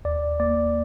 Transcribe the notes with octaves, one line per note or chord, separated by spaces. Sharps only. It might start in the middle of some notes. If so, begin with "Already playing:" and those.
D#2 D5
A#3 D5